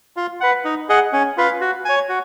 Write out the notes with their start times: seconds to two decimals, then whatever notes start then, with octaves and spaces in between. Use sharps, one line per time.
0.17 F4
0.41 B4 F#5
0.65 D#4
0.89 G#4 D#5 F#5
1.13 C#4
1.37 F4 B4 F5
1.61 F#4
1.85 C#5 G#5
2.09 F#4